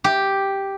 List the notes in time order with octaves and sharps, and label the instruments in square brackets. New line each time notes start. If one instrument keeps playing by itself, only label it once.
[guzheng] G4